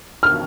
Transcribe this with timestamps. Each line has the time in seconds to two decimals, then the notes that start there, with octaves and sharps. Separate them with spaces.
0.23 F6